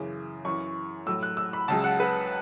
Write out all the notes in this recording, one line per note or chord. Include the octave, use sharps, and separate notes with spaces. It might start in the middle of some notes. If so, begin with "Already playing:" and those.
Already playing: F#2 C#3 E3
F#2 E3 C#6
A2 F#3 E6
F#6
E6
B5
C#2 C#3 F#3 A5
F#5
B4